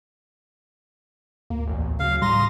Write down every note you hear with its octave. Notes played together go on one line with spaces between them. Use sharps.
D2 A#3
A1 E2
C#3 F#3 F5
A2 G3 A#5 C6 D#6 A#6